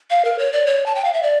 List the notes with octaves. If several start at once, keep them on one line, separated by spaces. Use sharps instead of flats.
F5
A#4
C#5
D5
C#5
A5
G5
F5
E5
D5